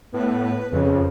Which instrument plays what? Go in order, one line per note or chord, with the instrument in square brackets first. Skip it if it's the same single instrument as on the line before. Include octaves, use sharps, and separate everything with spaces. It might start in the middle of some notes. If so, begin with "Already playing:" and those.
[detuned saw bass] A2 [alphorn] B3 [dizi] B4
[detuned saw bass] F2 [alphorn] C#3